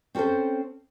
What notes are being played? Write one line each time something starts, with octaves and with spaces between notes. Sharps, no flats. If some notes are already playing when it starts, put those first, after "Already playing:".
C4 C#4 G4 A4 C5